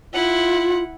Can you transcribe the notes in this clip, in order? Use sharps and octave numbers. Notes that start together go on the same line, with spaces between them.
E4 F4 F#5